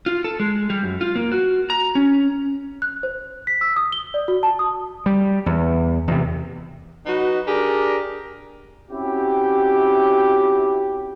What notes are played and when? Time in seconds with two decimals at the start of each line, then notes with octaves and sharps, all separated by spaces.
0.06 F4
0.24 A4
0.40 G#3
0.70 G3
0.83 F#2
1.01 F4
1.15 A#3
1.32 F#4
1.70 A#5
1.95 C#4
2.82 F#6
3.03 C5
3.47 B6
3.61 E6
3.76 D#6
3.92 G7
4.14 D5
4.28 F#4
4.43 A5
4.59 D#6
5.06 G3
5.46 E2
6.08 E2 C3
7.06 F#3 D#4 F#4 B4
7.46 D4 G4 G#4 A#4
8.91 C4 C#4 E4 F#4 G4